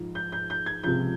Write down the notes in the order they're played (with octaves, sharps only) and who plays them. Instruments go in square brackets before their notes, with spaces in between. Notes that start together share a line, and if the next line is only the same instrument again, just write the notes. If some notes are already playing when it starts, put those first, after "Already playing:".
Already playing: [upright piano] G#2 F3
G6
G6
G6
G#6
C#2 C3 F3 G6